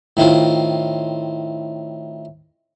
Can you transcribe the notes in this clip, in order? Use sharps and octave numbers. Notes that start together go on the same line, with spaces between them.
A2 D#3 C4 F4